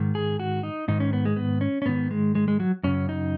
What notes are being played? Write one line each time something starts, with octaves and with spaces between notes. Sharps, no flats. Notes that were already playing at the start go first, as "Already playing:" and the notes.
Already playing: G#2 D#3
G#4
F#4
D#4
G#2 D#3 D#4
C#4
B3
G#3
B3
C#4
C#4
G#2 D#3 B3
G#3
G#3
G#3
F#3
F#2 C#3 C#4
D#4